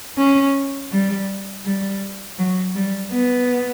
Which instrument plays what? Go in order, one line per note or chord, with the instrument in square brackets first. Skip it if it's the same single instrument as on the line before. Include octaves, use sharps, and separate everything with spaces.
[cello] C#4
G3
G3
F#3
G3
B3